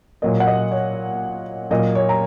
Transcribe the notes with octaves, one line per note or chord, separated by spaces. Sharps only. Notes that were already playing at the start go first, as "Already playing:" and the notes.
A#2 F#3 A#3 D#5
F#5
D#5
C#5
A#2 F#3 A#3 D#5
C#5
A#5